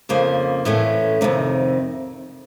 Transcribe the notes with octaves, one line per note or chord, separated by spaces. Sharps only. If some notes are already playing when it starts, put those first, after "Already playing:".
F2 C#3 F3 A#3
A2 E3 A3 C#4
F2 C3 D#3